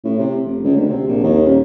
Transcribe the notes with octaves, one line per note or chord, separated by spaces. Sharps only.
A2
C3
F1
C#2
D2
C3
A#1
D#2
D#1